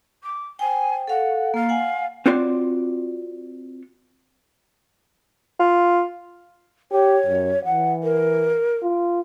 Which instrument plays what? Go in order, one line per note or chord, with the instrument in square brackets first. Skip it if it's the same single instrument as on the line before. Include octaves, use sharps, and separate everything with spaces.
[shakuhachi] D6
[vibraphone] C5 G5 [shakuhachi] G#5
[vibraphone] A4 F5 [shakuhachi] F#5
[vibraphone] A#3 [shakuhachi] F5
[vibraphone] F#5 G#5
[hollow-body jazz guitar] C4 F4 F#4 C#5 D5 C6
[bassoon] F4
[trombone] G4 [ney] C#5
[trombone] F#2
[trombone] E3 [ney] F#5
[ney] A#4
[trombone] F4